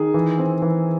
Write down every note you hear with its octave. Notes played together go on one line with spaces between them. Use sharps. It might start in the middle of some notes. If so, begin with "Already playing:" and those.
Already playing: D#3 G#4
E3
C4
E3